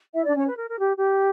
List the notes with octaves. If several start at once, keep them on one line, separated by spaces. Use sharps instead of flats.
E4 E5
D4 D5
C#4 C#5
B4
A#4
A#4
G4
G4